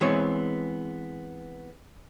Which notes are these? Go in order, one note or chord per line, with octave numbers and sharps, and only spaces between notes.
E3 G#3 B3 C4 C#5